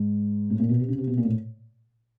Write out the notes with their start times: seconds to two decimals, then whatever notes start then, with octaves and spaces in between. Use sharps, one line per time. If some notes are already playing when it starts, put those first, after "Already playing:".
Already playing: G#2
0.50 A2
0.59 A#2
0.69 B2
0.80 C3
0.88 C#3
0.98 C3
1.07 B2
1.17 A#2
1.25 A2